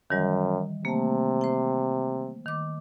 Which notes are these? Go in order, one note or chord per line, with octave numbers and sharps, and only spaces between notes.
F#2 D#3 E3 G3
C3 A3 A#3
C5 G5
D#3 D6